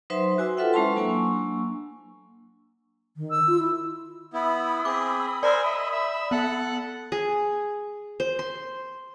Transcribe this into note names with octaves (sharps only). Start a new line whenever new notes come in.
F#3 D#4 B4 C5 E5 C6
F#4 C5 G#5 D6 E6
F4 A4 B4 E5 F#5 G5
G#3 C#4 E4 C5 A5 C6
F#3 A#3 D4 G#5 C#6 E6
D#3
E6
F4
E4
B3 E4 B5 D#6 E6
C4 G#4 D6
A#4 C5 D5 G#5
D#5 E5
E5
B3 A4 F#5 F#6
G#4
C5
C6